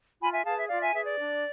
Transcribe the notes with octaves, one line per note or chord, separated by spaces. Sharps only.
F4 G#5 B5
E5 G#5
G#4 B4 F5 A5
E5
F4 D5 F5
E5 G#5
G#4 B4 E5
D5
D4